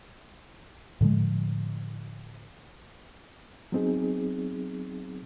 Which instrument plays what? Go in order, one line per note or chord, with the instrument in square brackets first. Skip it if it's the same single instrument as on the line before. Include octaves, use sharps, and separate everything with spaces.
[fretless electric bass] A2 D3 F3 G#3
[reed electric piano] F#3 B3 C4 D#4 G#4